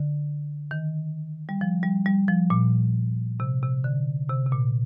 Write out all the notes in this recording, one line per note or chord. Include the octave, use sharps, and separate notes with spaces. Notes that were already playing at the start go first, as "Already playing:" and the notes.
Already playing: D3
D#3
G3
F3
G3
G3
F3
A#2
C3
C3
D3
C3
C3
A#2